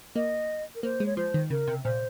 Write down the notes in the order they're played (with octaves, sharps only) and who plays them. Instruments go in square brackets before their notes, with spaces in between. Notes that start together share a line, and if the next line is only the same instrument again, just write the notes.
[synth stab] A#3 [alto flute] D#5
[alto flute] A#4
[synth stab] A#3 [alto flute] C5
[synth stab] G#3
[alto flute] C#5
[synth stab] F3 [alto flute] C5
[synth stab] D#3
[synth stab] C#3 [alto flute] A#4
[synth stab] C3
[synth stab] A#2 [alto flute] C5